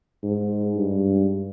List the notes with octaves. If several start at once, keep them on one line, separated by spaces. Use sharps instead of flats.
G#2
G2